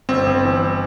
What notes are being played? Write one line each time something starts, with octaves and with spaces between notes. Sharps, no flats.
G1 C4
G1
E3